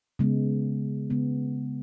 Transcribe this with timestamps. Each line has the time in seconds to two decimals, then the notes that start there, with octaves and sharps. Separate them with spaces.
0.19 C#3 G#3 B3
1.10 C#3 G#3 B3